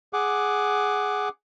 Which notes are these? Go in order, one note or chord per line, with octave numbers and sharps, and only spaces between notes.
G#4 F#5 D6